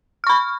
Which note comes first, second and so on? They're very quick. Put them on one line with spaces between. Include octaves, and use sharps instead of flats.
F6 C#6 B5